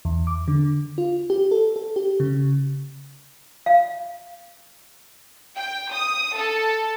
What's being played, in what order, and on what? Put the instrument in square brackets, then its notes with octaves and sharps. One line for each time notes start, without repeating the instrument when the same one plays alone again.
[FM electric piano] E2
D6
D3
F4
G4
A4
A4
G4
C#3
[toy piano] F5
[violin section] G5
D#6
A4